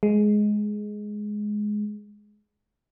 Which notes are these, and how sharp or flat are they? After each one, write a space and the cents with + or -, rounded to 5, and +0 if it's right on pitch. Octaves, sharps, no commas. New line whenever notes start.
G#3 +10